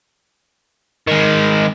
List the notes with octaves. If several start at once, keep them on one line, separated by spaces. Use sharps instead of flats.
D#3 G#3